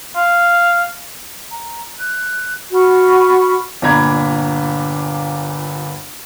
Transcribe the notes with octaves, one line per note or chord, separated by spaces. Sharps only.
F5
A#5
F#6
F#4 B5 C#6 F6
G1 A#2 D4 A#5 B5 G#6